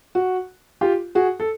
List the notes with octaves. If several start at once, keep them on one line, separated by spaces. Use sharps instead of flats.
F#4
F4 G4
F#4 G#4
A4